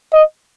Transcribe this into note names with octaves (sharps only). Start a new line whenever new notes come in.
D#5